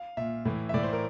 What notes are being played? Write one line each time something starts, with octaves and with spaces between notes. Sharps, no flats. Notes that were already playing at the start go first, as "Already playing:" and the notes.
Already playing: F5
A#2 E5
A2 E3
E5
A2 E3 D5
C5
A#4